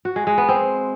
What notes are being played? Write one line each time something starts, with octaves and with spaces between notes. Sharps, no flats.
F#4
G#3
G#3
B3
C4